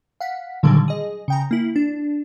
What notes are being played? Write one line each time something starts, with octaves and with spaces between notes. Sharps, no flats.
F5 F#5 B6
A#2 D3 D#3 F#3 G3
G#4 D#5
C#3 G5 A#5
A#3 E4
D4